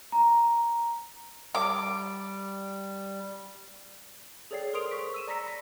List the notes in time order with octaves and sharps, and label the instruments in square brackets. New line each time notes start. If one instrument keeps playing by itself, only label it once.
[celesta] A#5
[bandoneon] G3 [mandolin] D6
[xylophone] G#4 A4 C#5 D5 G5 C7
A#4 C5 C6 D#6 D7 F7
C#6 B6
E6 D#7 E7
D5 A#5 A#6 B6 C#7
B5 A#6 B6